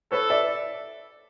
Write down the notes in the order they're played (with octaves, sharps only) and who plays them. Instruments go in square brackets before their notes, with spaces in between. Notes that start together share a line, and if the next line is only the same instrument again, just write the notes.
[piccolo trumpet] A4 [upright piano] B4 C#5
[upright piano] D5 E5